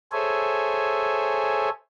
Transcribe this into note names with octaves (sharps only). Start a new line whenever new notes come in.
G#4 A4 C5 C#5 E5 G#5